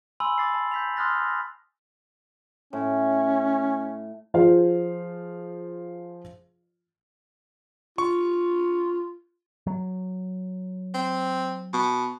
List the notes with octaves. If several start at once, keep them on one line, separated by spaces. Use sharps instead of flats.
G#5 B5 C6 E6 F#7
D6 A6 C7
A5
G6 B6 F7
C6 D#6 F6 F#6 A6 A#6
A#6
A2 C#4
F3 F4 G#4 C5 F5
F4 C#6
F#3
C4
B2